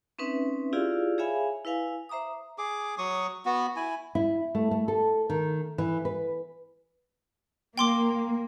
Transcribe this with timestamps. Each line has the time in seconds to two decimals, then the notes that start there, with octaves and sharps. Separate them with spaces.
0.19 C4 C#4 D#4 B4 E5
0.73 E4 F4 G4 G#4 D5 F5
1.18 G#4 C#5 E5 F5 G#5 B5
1.65 E4 B4 F5 G#5
2.09 C5 E5 A#5 D6 D#6
2.58 G#4 D6
2.98 F#3 C#6 D#6
3.45 B3 F#4
3.76 E4 G#5
4.15 E4
4.55 A3
4.71 A3
4.88 A4
5.30 D#3
5.78 E3
6.05 B4
7.78 A#3 G5 C6 D6